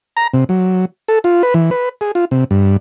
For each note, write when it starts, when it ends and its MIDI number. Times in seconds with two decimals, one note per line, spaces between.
0.17 0.27 82
0.33 0.44 48
0.49 0.85 54
1.08 1.19 69
1.24 1.43 65
1.43 1.54 71
1.54 1.70 52
1.71 1.89 71
2.01 2.12 68
2.15 2.25 65
2.31 2.44 48
2.51 2.77 43